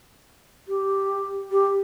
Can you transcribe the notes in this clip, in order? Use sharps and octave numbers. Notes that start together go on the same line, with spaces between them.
G4
G4